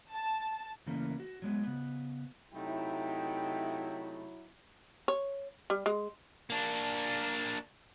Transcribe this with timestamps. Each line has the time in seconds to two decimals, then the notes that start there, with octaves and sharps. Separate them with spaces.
0.11 A5
0.86 C#3 E3 A3 A#3 C#4
1.20 F#4
1.42 F#3 G#3 B3
1.63 C#3 B3
2.54 C3 F#3 A3 D#4 E4 G5
5.08 C#5
5.70 G3
5.86 G#3
6.50 A#3 D4